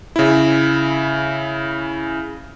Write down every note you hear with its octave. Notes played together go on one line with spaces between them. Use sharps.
C#3 E4